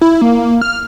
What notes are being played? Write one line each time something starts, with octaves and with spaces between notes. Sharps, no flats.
E4
A#3
F6